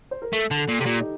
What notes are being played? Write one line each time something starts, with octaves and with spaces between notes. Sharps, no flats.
C5
A#4
A3 A4
D3
A4
A#2
C3 G4
A#2
D#4